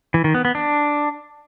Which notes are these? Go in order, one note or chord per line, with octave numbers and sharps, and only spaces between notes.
E3
D#3
B3
B3
D4